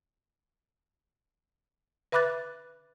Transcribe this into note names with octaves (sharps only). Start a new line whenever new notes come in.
B4 E5 B5 D6 F#6 A6